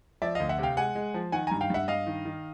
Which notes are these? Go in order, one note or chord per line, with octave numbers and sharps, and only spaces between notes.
F3 D5 E5
D#5 F5
D2
E5 F#5
C3 F5 G5
G#3 F#5 G#5
G#3
F3
D#3 F#5 G#5
G2 G#5 A#5
F5 G5
G2 E5 F#5
G2 D#5 F5
D#3
D#3